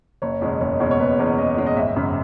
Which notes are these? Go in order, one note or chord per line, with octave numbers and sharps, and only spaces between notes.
F#1 C#5
E2 B2 G#3 C#4
F#1 C#5
E2 B2 G#3 C#4 C#5
C#5
F#1 B4
E2 B2 G#3 C#4
F#1 D#5
E2 B2 G#3 C#4
D#5
G#1 E5
F#2 C#3